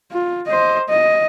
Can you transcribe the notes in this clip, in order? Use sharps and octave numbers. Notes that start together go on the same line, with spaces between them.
F4
C5 D#5
D#5